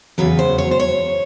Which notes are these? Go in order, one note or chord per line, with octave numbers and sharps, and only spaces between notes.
E2 C#3 F#3 B4
C5
C#5
C5
C#5